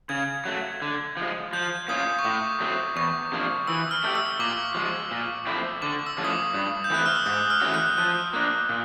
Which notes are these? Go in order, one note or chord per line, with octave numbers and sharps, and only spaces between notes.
C#3 G#6
F#3 A3
D3
F3 G#3
F3 G6
A#3 C#4 F4 D#6
C#6
A2 D6
F#3 A3 C4
E2 C#6
C3 F3 A#3 D4
E3 E6
F6
A3 D4 G4
E6
A#2 D6
F3 G#3
A#2
F3 A3 C4 E4
D3 D6
E6
F3 A3 C#4 E4
D#6
D6
G2
G6
E3 A3 C4 E4 F#6
F6
E6
G#2 D#6
F6
E3 A3 C#4 F#4
F#6
F3 F#6
A#3 D4
A#2